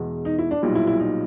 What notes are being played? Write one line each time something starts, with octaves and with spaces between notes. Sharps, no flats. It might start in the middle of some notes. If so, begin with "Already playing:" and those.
Already playing: E2 B2 G#3
D#4
E4
D4
B1 A#2 G3 D#4
E4
E4
D#4